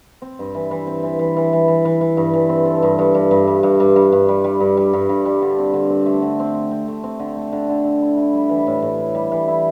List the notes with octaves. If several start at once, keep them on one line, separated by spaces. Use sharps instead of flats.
C4
G2
E3
E3
C4
E3
E3
E3
E3
E3
E3
E3
G2
E3
C4
A4
G2
G2
G2
G2
G3
G2
G2
G2
G2
G3
G3
G2
G3
G2
G2
G3
D3
C4
D3
C4
A3
D3
C4
C4
C4
A3
C4
D3
A3
D3
D3
D3
E4
E4
G3
E3
A2
A2
E4
G3
E3
E4